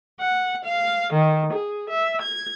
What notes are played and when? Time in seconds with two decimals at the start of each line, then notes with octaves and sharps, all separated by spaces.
0.20 F#5
0.63 F5
1.12 D#3
1.53 G#4
1.89 E5
2.21 G#6